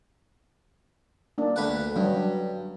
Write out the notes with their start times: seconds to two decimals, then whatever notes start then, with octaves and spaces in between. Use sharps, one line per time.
1.38 A#3 D4
1.56 D2 B4 F#5
1.96 G2 F#3 D4